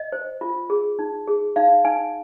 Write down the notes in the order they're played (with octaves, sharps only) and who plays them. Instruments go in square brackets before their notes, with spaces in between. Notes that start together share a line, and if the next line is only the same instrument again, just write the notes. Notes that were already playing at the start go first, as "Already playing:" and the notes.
Already playing: [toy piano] D#5
C5
F4
G#4
D#4
G#4
D#4 F5
D#4 G#5